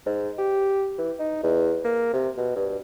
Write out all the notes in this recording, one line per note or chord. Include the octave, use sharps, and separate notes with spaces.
G#2
G4
E3
D#4
E2
A#3
C3
B2
G2